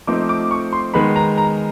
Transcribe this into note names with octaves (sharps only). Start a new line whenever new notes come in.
F3 A3 C4 D#4 D6
D6
C#6
C6
D#3 G#3 B3 B5
A#5
A#5